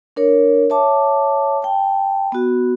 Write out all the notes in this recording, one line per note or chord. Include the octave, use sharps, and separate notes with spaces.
D4 A#4 C#5
C#5 E5 A5 D6
G5 A5
B3 F#4